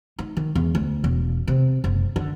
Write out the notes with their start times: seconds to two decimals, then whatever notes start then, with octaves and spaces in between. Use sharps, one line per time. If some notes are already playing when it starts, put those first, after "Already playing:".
0.19 D#4
0.37 D#3
0.55 E2
0.75 D2
1.04 E1
1.48 C3
1.84 F#1
2.16 D3